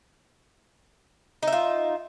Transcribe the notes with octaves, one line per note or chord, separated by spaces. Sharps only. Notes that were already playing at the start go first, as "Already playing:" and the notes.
D#4 F4 E5